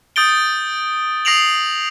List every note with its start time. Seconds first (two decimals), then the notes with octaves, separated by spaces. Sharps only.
0.16 D#6 G6 A6 D7 G7
1.25 D#6 A#6 C7 D7 F7 F#7